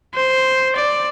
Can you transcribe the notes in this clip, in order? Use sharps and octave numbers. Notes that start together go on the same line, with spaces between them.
C5
D5